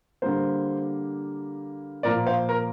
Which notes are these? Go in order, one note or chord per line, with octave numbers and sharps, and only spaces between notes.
D3 G3 A#3 C5
A#2 F3 A#3 A#4 D5
C5 F5
A#4